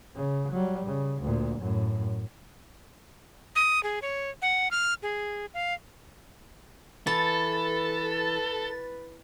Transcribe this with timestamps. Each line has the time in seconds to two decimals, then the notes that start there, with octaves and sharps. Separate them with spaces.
0.15 C#3
0.52 F#3 G3
0.87 C#3
1.22 D2 A#2
1.59 F#2 A2
3.56 D#6
3.83 G#4
4.02 C#5
4.42 F#5
4.71 F6
5.03 G#4
5.54 F5
7.07 E3 A4 B4 A6